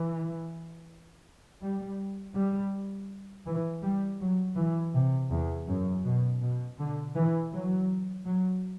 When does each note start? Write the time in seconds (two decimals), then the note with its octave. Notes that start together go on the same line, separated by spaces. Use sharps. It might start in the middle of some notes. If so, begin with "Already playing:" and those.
Already playing: E3
1.62 G3
2.36 G3
3.46 E3
3.83 G3
4.20 F#3
4.57 E3
4.94 C3
5.31 E2
5.68 F#2
6.05 B2
6.41 B2
6.78 D3
7.15 E3
7.52 F#3
8.26 F#3